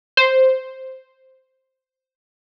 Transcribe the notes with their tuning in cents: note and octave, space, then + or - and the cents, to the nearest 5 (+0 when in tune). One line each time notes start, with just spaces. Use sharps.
C5 +0